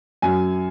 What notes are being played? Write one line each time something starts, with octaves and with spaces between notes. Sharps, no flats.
F#2 G#5